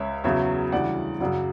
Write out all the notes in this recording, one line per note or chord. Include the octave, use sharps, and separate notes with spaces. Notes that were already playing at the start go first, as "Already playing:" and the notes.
Already playing: C#2 C#5 E5
E2 C#3 F#3 C#5 E5
D2 C#3 E3 G3 D5 F#5
F#2 C#3 F#3 D5 F#5